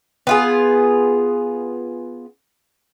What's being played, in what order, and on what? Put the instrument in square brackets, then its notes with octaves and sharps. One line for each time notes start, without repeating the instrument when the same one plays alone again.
[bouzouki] B3 F4 G#4